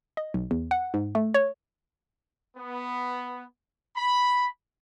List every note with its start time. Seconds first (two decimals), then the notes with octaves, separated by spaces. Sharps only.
0.17 D#5
0.34 B1
0.51 E2
0.71 F#5
0.94 G#2
1.15 A3
1.34 C#5
2.57 B3
3.96 B5